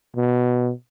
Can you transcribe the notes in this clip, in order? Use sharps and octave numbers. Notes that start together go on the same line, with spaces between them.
B2